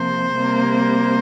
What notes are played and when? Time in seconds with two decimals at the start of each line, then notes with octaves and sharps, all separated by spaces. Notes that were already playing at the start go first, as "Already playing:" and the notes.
Already playing: C3 F3 A#3 C5
0.34 C3 G3 A#3